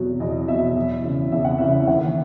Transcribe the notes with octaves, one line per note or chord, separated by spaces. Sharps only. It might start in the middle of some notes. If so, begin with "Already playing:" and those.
Already playing: E2 B2 F#3
E2 D#5
B2 F#3 E5
E2
C#3 E3
E2 E5
F#5
C#3 E3 E5
E5
D#2 F#5